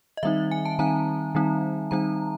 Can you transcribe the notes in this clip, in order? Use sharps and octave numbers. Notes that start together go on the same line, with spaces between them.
D#5
D#3 G3 C4 D#4 E5
G#5
A5
D#3 G3 C4 D#4 A#5
D#3 G3 C4 D#4
D#3 G3 C4 D#4 A#5